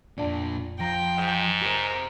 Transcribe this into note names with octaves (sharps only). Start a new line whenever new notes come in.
F2 A#2 D4 D5
F3 G5 A#5 A#6
G#2
G4 A#4 C5